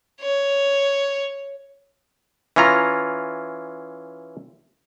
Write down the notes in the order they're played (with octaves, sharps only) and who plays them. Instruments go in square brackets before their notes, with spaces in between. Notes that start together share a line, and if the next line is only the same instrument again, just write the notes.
[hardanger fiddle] C#5
[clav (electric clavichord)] E3 C#4 F4 A#5